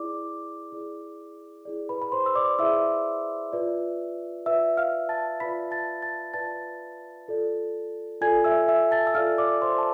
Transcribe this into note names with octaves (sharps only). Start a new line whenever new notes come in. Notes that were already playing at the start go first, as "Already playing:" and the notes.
Already playing: E4 G#4 D5 D6
E4 G#4 D5
E4 G#4 D5
B4 B5
B5
C5 C6
E6
D5 D6
E4 G#4 D5 E5 E6
F4 B4 D5
F4 B4 D5 E5 E6
F5 F6
A5 A6
F4 B4 D5 B5 B6
A5 A6
A5 A6
F4 B4 D5 A5 A6
F4 A4 D5
F4 A4 D5 G#5 G#6
E5 E6
E5 E6
A5 A6
E6
F4 A4 D5 F5 F6
D5 D6
C5 C6
A5